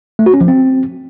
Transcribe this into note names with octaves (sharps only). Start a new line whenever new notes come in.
A3
F#4
C#4
F3
C4